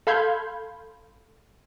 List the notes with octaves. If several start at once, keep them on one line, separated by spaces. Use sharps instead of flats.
A4 F5 B5 C6 G6 G#6